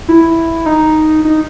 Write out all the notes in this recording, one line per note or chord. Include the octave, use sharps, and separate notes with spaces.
E4
D#4
D#4